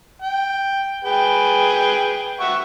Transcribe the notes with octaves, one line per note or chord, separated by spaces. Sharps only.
G5
G#4 B4 G5
E5 F#5 C#6